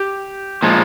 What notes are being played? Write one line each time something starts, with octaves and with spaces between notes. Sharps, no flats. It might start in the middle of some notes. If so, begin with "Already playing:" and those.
Already playing: G4
A#2 F3 G#3